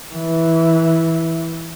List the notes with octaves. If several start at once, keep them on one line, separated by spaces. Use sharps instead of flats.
E3